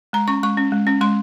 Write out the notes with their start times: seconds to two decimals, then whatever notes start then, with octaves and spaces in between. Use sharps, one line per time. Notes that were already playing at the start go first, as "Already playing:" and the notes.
0.13 G#3 A#5
0.28 C#4 C#6
0.43 G#3 C#6
0.58 C#4
0.72 G#3
0.87 C#4
1.01 G#3 C6